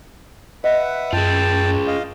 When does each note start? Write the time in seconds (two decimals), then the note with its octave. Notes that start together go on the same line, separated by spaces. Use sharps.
0.64 B4 D#5 E5 F#5
1.13 F#2 F4 G#4 G5 A5
1.87 D#5 F5